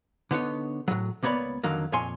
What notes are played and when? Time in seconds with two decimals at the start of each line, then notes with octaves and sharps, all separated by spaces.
0.31 D3 B3 D#4 C#5
0.88 A2 F#3
1.23 C#2 A#3 B3 C#5 D5 B5
1.64 F2 D3 D#3 F#3 A#3
1.93 F2 A#2 C#5 G#5 C6